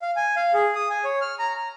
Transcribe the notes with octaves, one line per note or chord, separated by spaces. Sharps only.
F5
G#5
F5
G#4
D#6
G#5
C#5
F6
A#5
A#5